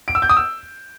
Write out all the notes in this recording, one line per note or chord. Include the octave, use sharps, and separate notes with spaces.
D7
E6
G6
D#6
E6